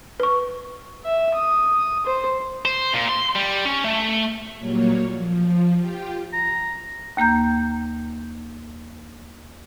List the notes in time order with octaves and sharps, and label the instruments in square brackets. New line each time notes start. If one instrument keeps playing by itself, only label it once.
[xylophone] B4 C#6
[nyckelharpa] E5
D#6
C5
[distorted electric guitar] C5
A#2
C6
G3
C#4
A3
[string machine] A#2 F#3 G3 A#3 C#5
F3
F4 G4 G5
[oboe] A#5
[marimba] D#2 A#3 A#5 G6